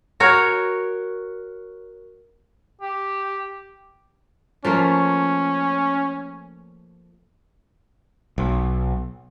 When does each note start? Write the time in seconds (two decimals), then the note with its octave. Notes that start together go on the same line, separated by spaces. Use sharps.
0.20 F#4 A#4 C#5
2.81 G4
4.65 F3 A3 A#3 C#4
8.38 B1